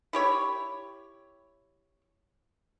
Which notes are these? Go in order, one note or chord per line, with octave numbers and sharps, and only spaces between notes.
E4 G4 C#5